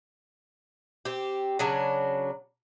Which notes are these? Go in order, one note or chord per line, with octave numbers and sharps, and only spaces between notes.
C4 G4
C#3 F#3 D4